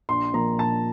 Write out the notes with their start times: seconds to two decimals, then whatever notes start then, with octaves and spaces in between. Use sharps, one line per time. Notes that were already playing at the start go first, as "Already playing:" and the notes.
0.09 A#1 C6
0.33 A#2 F3 A#3 A#5
0.59 A#1 A5